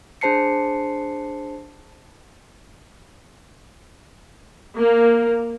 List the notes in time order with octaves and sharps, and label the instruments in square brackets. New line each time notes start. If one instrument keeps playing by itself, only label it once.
[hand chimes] D4 G#4 C5 A5 C7 C#7
[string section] A#3